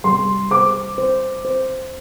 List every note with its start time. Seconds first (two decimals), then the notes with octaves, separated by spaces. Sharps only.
0.04 G3 C6
0.51 C5 D6
0.98 C5
1.45 C5